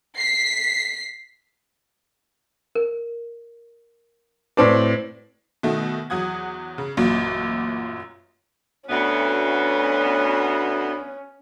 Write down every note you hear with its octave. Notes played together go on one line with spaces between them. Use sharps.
B6 C7
A#4
A2 C4 F#4 B4 D5 A5
B2 D#3 A3 F#4
E2 F#3 F#5 D#6 G#6
C#3
A1 F#2 A#2 F#3 F4 F#4
D2 B3 C#4